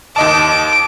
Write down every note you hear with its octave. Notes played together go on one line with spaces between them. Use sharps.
D#2 D#5 A5 D6